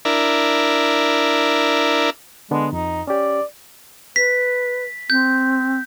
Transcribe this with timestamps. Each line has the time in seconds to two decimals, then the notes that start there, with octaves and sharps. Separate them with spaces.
0.05 D4 E4 A#4
2.51 D3 G#3 B3 D4
2.73 F2 D#4
3.07 C#4 G4 D5
4.16 B4 B6
5.10 C4 G6